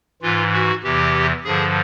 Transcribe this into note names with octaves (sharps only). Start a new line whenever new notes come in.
G#2 E3 F4
F#4
E2 C3 E3 G4
G2 D3 F3 G#4